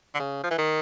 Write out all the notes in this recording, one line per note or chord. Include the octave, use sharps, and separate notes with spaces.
D3
C#3
F3
E3
D#3